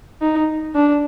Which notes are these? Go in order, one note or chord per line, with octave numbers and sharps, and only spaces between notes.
D#4
D4